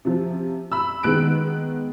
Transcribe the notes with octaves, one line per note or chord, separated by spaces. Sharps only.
C3 F3
B5 E6
D#3 G#3 B3 F#6 D7